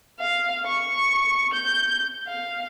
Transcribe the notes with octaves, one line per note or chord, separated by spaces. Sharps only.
F5
C#6
G6
F5